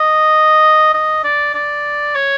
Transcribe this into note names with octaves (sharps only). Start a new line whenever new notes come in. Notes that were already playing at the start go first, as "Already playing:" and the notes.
Already playing: D#5
D#5
D5
D5
C#5